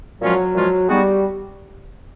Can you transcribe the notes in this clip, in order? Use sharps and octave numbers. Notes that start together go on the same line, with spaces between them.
A#2 F3 F#3 G#3 C#4 F4
A#2 F3 G#3 C#4 F4
G3 G#3 B3 D#4 F#4